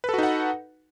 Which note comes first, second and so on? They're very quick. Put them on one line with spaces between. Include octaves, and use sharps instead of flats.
B4 A4 F#4 D#4 F#5